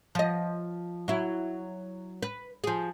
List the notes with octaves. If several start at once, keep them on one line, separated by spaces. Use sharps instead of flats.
F3 D#5
F#3 E4
B4
F3 G#4